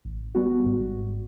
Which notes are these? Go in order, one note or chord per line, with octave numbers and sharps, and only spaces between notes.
A1
G3 B3 F#4
G#1 G#2